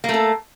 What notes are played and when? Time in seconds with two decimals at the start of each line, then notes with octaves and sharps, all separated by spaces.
0.04 A#3
0.09 A3
0.14 A4